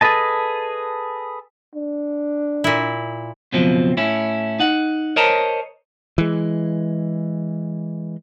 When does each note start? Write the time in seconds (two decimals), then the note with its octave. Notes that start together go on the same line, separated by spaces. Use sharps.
0.01 G#4 A4 B4 D#5 A5
1.75 D4
2.64 A#2 E4
3.53 C#2 F#2 B2 F3 C4
3.97 A2 C#4 E4
4.60 D#4 F#5
5.16 A#4 C5 C#5 D#5 A5 A#5
6.18 E3 G#3